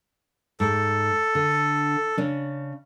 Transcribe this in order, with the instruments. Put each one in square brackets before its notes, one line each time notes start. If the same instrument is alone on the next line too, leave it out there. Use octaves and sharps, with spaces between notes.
[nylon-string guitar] G#2 [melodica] A4
[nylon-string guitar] D3
C#3 C#4 D4